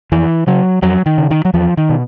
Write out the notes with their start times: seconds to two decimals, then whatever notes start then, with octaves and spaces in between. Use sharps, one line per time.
0.12 F2 E3
0.47 C#3 F#3
0.82 F2 F#3
1.06 D#3
1.18 C#3
1.31 D#3
1.45 F#3
1.54 E2 F3
1.77 D#3
1.89 B2